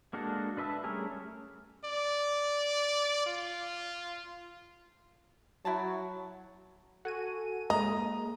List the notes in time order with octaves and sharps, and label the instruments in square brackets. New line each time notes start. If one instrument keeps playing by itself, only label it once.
[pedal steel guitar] G#3 A#3 D4 F#4 A4
D4 B4 E5 A5 E6
G3 A3 C#4 G#4 A#4
[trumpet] D5
F4
[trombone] F#3 [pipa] E4 F#4 A5
[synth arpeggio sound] F#4 G#5 D#7 [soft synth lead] A4
[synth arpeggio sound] G#3 A#3 [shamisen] D#5 [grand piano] A#5